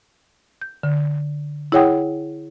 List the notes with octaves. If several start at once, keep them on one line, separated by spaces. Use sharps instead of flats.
G6
D3
E4 G#4 C#5 F#5 G5 D#6